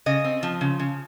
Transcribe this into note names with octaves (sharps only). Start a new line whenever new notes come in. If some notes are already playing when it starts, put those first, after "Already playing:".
C#3 D#5
C4
F3
C#3
C#3